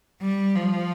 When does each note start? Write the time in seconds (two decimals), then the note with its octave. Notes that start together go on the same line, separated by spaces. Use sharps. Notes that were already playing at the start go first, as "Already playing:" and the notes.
0.22 G3
0.55 F3